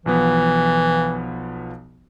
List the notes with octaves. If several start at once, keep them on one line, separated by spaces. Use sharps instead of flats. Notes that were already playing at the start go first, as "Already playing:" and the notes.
B1 E3 F3 B3